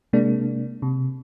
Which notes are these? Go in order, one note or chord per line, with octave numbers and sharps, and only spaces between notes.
C3 G#3 A#3 D4
C3